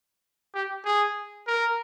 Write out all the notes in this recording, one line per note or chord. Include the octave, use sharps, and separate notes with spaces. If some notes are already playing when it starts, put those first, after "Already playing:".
G4
G#4
A#4